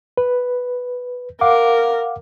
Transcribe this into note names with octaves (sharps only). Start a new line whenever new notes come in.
B4
A#4 F5 F#5 D6